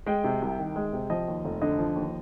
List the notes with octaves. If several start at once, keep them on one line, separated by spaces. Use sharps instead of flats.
G#3 G5
C3
C2
D#3
G#3
C3
F3 D#5
D#2
F1
D3 D#5
F3
D#2